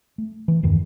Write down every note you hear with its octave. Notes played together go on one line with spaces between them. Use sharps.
A3
E3
E2 G2 D#3 E3